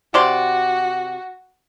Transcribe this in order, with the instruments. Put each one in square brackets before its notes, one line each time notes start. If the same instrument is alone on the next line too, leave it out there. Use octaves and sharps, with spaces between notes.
[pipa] C3 D5 C6 [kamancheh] F#4